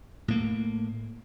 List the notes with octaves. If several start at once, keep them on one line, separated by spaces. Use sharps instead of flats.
A2 A#3